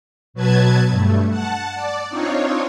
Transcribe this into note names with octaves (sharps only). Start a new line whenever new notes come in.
B2 F#3 B4 A5 G#6
G2 A3
F#5 A5
D5
C4 D4 D#4 F4 C#5